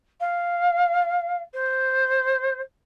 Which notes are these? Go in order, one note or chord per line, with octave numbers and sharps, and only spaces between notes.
F5
C5